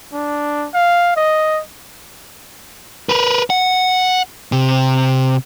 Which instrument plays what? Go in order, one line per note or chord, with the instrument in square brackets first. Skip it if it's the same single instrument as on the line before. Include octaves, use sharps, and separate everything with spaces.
[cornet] D4
F5
D#5
[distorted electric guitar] A#4 B4
F#5
C3